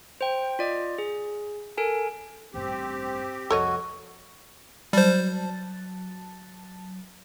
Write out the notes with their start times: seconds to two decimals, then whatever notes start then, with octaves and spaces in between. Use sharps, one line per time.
0.21 C5 G5
0.59 F4 D5 D#5
0.98 G#4
1.77 A4 A#4 G#5
2.54 A1 G2 C4 G4
3.50 C2 F2 F#4 A4 C#5 D#5
4.93 F#3 G3 C5 A5 A6